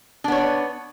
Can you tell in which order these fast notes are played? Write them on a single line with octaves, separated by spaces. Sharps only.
D4 B3 C#5